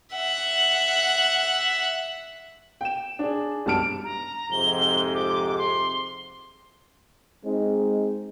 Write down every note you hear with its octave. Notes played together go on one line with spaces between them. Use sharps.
E5 F#5
G5 E7
D4 G#4
B1 G2 A5 F6 D7
A#5
F2 G#2 C3 G7
D6
C6
G#3 C4 D#4